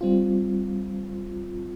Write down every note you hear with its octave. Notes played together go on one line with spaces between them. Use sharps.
G3 C4 F4